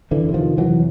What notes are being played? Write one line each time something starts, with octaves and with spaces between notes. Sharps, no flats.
F2 D3 E3
C3
D#3 F3
F2
E3 F#3
C3